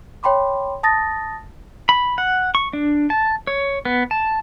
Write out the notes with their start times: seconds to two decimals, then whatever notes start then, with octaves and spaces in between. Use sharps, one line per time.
0.23 C#5 G5 B5 C6 D6
0.83 A5 D#6 A6 A#6
1.89 B5
2.18 F#5
2.55 C#6
2.73 D4
3.10 A5
3.47 C#5
3.85 B3
4.11 A5